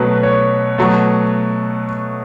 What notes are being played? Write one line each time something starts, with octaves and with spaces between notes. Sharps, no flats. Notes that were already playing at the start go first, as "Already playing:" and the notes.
Already playing: B2 F#3 A3 B4
C#5
B2 F#3 A3